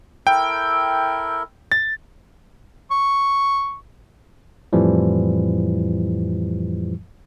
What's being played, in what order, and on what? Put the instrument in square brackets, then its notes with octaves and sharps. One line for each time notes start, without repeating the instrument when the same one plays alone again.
[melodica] E4 A4 A#4 [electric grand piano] G5
[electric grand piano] A6
[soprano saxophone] C#6
[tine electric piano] F2 A2 E3 F3 G3